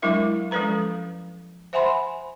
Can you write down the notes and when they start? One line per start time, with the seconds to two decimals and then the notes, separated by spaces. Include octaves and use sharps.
0.02 F#3 G#3 D4 E4 A#4 E5
0.51 F3 G#3 C#4 A4 B4 A#5
1.73 C5 E5 F#5 G#5 B5 C6